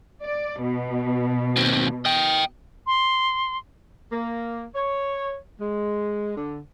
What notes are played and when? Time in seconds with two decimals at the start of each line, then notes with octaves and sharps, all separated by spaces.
0.23 D5
0.60 B2
1.57 D#2 C4
2.05 D#5 G5
2.87 C6
4.12 A#3
4.74 C#5
5.60 G#3
6.36 D3